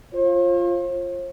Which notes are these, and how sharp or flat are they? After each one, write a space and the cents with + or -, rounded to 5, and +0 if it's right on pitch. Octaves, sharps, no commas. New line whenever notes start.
F4 -5 C5 +45